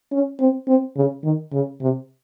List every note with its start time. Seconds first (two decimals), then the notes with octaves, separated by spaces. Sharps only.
0.12 C#4
0.40 C4
0.68 C4
0.96 C#3
1.24 D#3
1.53 C#3
1.81 C3